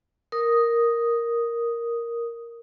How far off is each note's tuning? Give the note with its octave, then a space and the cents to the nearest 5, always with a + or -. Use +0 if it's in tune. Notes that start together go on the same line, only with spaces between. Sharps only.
A#4 +0 D#6 +0